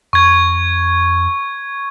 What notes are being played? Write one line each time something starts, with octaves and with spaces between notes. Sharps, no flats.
F2 C#6 G#6